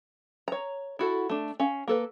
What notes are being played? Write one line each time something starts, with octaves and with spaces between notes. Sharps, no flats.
C#5 A#5
E4 F#4 A4
A3 D4
C#4 F5
A#3 A4 B4